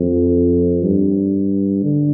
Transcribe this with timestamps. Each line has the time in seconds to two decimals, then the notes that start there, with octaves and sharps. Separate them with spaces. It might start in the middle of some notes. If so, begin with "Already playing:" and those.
Already playing: F2
0.82 G2
1.83 D3